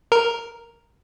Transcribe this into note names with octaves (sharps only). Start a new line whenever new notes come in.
A#4